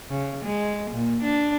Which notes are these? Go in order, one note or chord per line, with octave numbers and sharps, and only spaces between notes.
C#3
G#3
A#2
D4